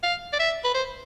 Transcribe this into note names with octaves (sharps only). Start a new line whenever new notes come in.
F5
D5
E5
B4
C5